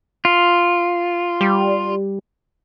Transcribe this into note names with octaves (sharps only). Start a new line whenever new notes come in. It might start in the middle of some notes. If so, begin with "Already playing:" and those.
F4
G3